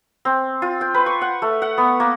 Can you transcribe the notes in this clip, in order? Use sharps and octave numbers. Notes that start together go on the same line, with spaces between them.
C4
F4
G5
B4
C#6
F#5
A3
F#5
B3
A#3